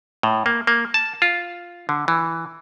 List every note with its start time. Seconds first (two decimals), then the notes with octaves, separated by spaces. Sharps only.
0.23 A2
0.46 A#3
0.67 A#3
0.94 A5
1.22 F4
1.89 D3
2.08 E3